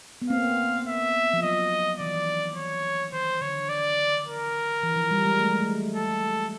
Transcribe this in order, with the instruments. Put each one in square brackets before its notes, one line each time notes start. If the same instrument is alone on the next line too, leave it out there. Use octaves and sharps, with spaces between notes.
[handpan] B3
[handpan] A#3 C4 [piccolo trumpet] F5
[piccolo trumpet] E5
[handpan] F3
[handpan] F#3 [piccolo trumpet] D#5
[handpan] E3 [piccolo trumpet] D5
[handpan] D#3
E3
[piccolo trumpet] C#5
[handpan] D#3 [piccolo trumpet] C5
[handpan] D3 [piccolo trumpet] C#5
[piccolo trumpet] D5
A#4
[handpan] E3
F3
G3
G#3
A3
G#3
A3
[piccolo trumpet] A4